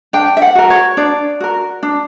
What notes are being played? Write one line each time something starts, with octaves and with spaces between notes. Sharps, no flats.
D4 G5
E5
F#5
F#4 A#4
C#5
D4 D5
F#4 A#4
D4